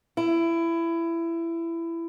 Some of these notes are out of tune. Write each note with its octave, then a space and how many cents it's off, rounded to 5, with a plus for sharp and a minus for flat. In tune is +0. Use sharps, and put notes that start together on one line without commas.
E4 +20